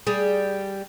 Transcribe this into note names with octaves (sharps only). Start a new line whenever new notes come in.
G3 G#4